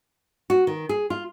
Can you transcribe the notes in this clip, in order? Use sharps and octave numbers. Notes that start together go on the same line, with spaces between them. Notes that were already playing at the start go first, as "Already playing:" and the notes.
F#4
D#3
G#4
F4